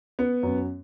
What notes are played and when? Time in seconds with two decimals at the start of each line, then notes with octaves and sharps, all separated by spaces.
0.19 B3
0.43 F#2